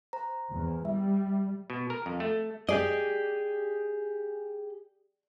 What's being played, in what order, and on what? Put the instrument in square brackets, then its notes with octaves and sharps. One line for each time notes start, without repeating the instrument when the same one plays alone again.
[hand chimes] C5 A#5
[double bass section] E2
[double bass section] G3 [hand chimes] E5
[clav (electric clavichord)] B2
A#4
F2
A3
[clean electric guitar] G4 G#4 D#5 [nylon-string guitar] D5